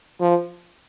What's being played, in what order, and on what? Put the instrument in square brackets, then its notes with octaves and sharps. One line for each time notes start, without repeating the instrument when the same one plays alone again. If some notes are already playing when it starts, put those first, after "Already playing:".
[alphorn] F3